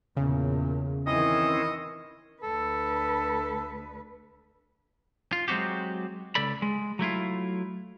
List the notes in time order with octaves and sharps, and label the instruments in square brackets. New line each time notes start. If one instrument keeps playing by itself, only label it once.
[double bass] E2 A#2 [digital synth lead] C#3
[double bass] D#3 E3 [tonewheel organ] C4 C#4 E4 [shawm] D#5
[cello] D2 B4 [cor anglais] A4
[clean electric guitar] F4
F#3 G#3 C4 F#4 G4
C#2 A4 D5 B5
G#3
F#3 A3 E4 F4